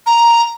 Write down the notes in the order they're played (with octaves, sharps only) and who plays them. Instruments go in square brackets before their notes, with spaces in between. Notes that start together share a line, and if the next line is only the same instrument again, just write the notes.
[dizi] A#5